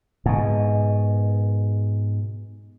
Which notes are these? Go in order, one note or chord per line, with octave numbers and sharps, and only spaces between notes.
G#2 B2